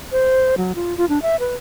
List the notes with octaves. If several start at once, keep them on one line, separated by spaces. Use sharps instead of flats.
C5
F#3
F4
F4
D4
E5
B4